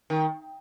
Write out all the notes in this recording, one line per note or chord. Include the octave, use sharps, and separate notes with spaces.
D#3